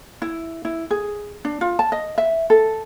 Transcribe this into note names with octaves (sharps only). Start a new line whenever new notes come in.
E4
E4
G#4
D4
F4
A5
D#5
E5
A4